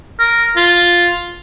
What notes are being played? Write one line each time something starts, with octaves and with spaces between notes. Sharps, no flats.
A#4
F4